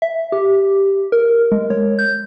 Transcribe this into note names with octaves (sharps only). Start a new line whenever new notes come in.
E5
G4
A#4
G#3
C#5
G6